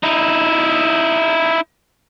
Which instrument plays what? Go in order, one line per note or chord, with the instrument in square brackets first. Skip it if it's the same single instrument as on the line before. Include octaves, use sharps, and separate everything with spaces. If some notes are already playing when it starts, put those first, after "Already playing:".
[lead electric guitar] D#4 E4